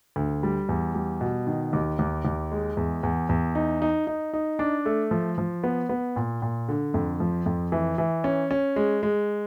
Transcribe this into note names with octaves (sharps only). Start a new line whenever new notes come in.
D2
G3
E2
G3
B2
D#3
D#2
D#2
D#2
G#3
E2
E2
E2
D#4
D#4
D#4
D#4
D4
A3
F3
F3
B3
B3
A#2
A#2
D3
F2
F3
F2
E3
E3
C#4
C#4
G#3
G#3